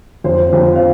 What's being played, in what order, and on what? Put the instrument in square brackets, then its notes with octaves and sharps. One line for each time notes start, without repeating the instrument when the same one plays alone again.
[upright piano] F2 C5
F2 C5
F5